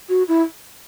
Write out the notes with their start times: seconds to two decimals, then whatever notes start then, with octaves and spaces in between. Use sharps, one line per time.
0.09 F#4
0.28 E4